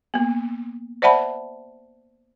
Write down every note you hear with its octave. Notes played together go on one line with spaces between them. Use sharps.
A#3 B3
C5 D5 E5 F#5 A5 B5